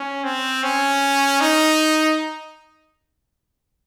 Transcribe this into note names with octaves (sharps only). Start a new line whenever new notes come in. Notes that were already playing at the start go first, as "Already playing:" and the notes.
Already playing: C#4
C4
C#4
D#4